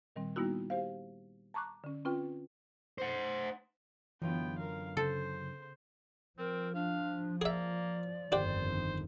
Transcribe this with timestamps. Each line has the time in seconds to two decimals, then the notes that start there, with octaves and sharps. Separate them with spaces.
0.16 A#2 D#3 G3 C4
0.36 G3 A#3 B3 D#4 E4 F#4
0.70 G4 C5 F5
1.54 A5 A#5 C#6 D6 F#6
1.84 D3 C#4
2.05 C4 C#4 F4 B4 G5
2.98 C5 F#5
4.22 F#2 D3 E3 B3 F4 G5
4.58 A#4 F5
4.97 C#3 A4 C5
6.38 F3 C4 A#4
6.75 D4 F5
7.42 A#3 G#4 D5 E5
8.32 G1 F2 D#3 D4 G4 C5